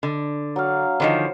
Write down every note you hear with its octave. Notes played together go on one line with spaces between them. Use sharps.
D3
F#3 F5
D3 D#3 F3 C5